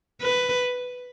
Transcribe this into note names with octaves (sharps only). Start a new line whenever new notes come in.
B4